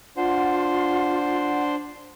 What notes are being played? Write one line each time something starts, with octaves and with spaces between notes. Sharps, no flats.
D4 F4 C5 F#5